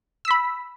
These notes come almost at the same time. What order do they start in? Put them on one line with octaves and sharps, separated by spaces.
E6 B6 B5